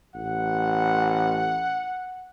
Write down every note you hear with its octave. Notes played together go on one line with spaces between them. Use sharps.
A1 F#5